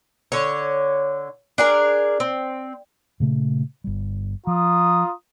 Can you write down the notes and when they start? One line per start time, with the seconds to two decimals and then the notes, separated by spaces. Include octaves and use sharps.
0.32 D3 C#5
1.58 D4 G#4 A#4
2.20 C4
3.20 A#2 C#3 A3
3.84 G1 G3
4.47 F3 F4 A#5 D#6